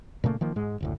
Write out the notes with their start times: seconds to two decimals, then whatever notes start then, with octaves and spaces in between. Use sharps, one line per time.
0.24 A#2 C#3 A3 A#3
0.41 D#3 F3 A#3
0.56 G#2 G#3
0.80 F#1 D2 A2